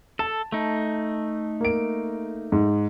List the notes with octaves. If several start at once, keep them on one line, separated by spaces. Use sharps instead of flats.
A4 A5
A3 D#4
A#3 D7
G#2